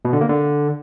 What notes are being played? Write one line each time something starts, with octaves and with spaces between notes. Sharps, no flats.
B2
D3
A#3
D3